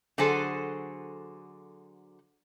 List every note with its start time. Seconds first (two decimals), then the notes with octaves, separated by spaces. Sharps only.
0.18 D3 F#3 F#4 G#4 A4 C5